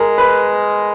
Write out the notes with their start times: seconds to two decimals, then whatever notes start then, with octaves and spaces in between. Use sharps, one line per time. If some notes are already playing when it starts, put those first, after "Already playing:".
Already playing: G#3 A#4
0.18 B4